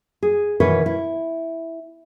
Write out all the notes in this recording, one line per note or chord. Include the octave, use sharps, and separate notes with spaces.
G#4
B2 D#3 E3 B4 C#5
E4